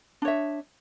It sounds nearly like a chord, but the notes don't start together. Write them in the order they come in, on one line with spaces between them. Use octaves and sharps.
D4 C#5 E5